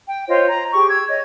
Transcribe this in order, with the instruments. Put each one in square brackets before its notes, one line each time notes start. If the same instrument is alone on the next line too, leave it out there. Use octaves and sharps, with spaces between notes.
[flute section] G5
F4 C5 C#5 D#5
A#5
G4 G#4 C#6
E6 G#6
C#5 D#5